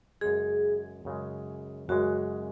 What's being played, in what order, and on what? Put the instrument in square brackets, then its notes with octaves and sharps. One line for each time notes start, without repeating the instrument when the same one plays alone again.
[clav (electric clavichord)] F#2 C#3 G#3 [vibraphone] G#4
[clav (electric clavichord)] F#2 C#3 G#3
[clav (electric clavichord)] F#2 C#3 G#3 [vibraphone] F#4